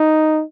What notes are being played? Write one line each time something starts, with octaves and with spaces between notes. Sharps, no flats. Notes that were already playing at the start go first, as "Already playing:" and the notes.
Already playing: D#4